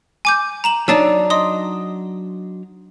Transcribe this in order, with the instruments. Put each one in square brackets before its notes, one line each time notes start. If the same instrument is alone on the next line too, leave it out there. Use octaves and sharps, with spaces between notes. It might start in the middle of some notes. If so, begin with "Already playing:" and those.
[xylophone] G#5 D6 G6
A#5 E7 F#7
[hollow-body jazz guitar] F#3 D4 D#4 [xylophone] D5 A5 E6
[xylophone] D#5 C6 D#6